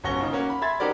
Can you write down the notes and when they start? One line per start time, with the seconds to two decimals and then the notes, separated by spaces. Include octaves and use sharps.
0.04 G1 C#4 F#4 C#6 A#6 G7
0.20 C#3 D#4
0.33 A#3 C#4 F#4
0.50 B5
0.62 E5 B5 C6 G#6 A6
0.80 C4 D#4 F#4 G4 A#4 D5